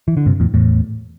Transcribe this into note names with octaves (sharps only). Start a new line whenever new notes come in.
E3
D3
G2 C3
E2 A2
E2 A2